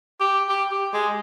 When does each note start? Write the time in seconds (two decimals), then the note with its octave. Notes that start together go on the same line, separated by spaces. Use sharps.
0.21 G4
0.49 G4
0.72 G4
0.93 G#3